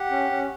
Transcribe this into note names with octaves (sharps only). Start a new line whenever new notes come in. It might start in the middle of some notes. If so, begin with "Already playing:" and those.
Already playing: G4 F#5
C#4
C#4